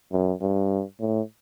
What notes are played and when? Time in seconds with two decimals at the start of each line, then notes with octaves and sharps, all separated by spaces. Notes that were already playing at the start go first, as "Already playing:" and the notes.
0.12 F#2
0.41 G2
1.00 A2